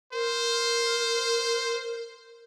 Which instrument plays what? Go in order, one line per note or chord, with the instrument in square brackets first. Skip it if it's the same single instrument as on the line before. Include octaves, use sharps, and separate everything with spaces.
[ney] A#4 [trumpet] C5